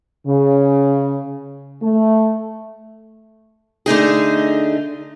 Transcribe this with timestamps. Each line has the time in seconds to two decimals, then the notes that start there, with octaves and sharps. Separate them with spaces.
0.27 C#3
1.82 A3
3.86 D3 A3 D#4 G#4